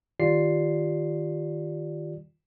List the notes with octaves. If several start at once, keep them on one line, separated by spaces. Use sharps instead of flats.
D#3 F4 G4 D5 C7